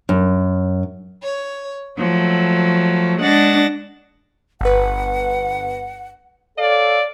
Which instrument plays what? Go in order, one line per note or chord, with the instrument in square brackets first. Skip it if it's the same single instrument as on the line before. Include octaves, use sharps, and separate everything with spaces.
[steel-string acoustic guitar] F#2
[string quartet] C#5
F3 F#3 A3
G#3 D4 F#5 A6 A#6
[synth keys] G1 B4 [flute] F#5
[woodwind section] A4 C#5 F5 [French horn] D5